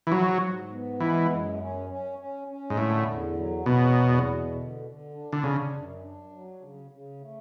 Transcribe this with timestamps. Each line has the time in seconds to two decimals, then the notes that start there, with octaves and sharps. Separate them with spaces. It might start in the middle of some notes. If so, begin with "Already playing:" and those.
0.07 E3
0.11 G#2 F#3
0.41 G#2
0.71 B3
1.00 E3 G#3
1.30 F#2
1.60 C#4
1.89 C#4
2.18 C#4
2.48 C#4
2.70 G#2
2.78 A2 D3
3.07 E2
3.36 F#3
3.66 E2 B2
3.95 E2
4.25 B2
4.55 D3
4.84 D3
5.14 D4
5.32 D3
5.43 C#3 D4
5.72 F#2
6.02 D4
6.32 F#3
6.61 C#3
6.91 C#3
7.20 A3